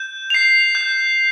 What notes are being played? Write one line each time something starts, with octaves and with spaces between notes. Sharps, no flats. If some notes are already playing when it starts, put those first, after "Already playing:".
Already playing: G6
C7 F7
G6